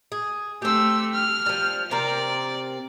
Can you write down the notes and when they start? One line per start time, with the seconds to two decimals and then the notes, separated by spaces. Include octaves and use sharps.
0.12 G#4
0.62 A3 C4 G4 E6
1.14 F6
1.46 F3 G3
1.91 C3 C4 A#4 D5